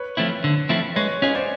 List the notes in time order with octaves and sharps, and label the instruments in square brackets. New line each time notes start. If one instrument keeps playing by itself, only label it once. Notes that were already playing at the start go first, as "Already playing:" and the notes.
Already playing: [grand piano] B4 C#5
[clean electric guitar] F3 A3 C4 E4
D3
F3 A3 C4 E4
[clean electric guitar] G#3 [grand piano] B4 C#5
[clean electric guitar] C#4 F4 G#4 [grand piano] C#5 D#5
[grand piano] C5 D5